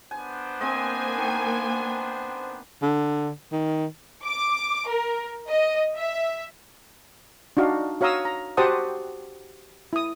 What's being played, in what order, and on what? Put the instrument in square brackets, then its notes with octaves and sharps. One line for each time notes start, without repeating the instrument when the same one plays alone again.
[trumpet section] B3 D4 C5 [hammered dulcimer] G#5
[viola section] A#3 G#5 [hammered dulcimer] C4 D#5
[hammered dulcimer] D#3
[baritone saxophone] D3
D#3
[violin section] D6
A#4
D#5
E5
[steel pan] D4 D#4 F#4 F5
F#4 C#5 F5 A#5 D#6 E6
A#5
F#4 G4 C5 F#5 A5 D#6
E4 D#6